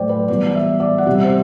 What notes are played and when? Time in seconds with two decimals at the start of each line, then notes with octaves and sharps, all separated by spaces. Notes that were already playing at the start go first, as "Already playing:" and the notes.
Already playing: A2 F#3 A3 C5 D5 G5
0.09 B4
0.28 E3 G3 B3 D5
0.55 E5
0.80 D5
0.98 F#5
1.06 C3 G3 C4 E5
1.24 C5